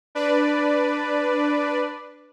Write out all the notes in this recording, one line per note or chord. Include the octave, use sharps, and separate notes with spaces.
D4 B4 D5